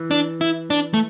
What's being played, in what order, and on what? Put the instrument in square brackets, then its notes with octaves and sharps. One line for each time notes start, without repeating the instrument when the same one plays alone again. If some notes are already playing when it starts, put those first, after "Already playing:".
Already playing: [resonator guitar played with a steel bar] E3
[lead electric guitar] D4
E4
D4
A3